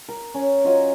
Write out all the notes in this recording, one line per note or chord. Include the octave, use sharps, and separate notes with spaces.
A#4
C#4
F#3 F4 C#5 D#5